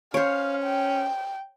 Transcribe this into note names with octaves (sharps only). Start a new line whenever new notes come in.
C#4 C5 C#5 F5
G5